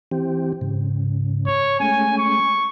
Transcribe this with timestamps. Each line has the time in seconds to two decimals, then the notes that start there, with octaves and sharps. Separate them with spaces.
0.11 E3 C4 G4
0.61 G#2 C#3
1.47 C#5
1.80 G#3 A3 C#4 G#5
2.17 C#6